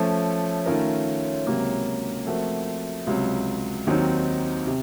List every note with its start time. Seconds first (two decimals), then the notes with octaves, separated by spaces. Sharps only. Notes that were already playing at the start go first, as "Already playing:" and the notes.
Already playing: F3 A3 C#4 A4
0.66 D#3 A3 C#4 F4 A#4
1.46 C#2 C3 F#3 A#3 C#4
2.27 F3 A3 C4 F#4 A#4
3.07 C#2 C3 F#3
3.87 D#2 D#3 F#3 C4 D#4
4.67 C3